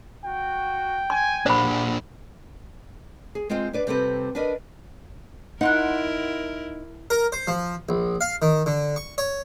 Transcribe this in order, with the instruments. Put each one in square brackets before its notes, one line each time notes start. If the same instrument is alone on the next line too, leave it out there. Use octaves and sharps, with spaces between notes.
[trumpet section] F#4 [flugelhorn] G5
[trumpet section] G#5 [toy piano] C6
[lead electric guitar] A#2 D4 [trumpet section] G3 G4 F#5 [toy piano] C5 B5
[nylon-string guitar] G#4
G#3 C4 F4 C5 G5
D4 B4 D5
C3 G3 C4 G4 A4 B4
D4 A#4 B4 D5 D#5
[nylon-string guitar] D#4 [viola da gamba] E4 A#4 [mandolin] F#5 C6 F#6
[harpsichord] A#4
C5
F3
A#1
F5
D#3
D3
C#6
C#5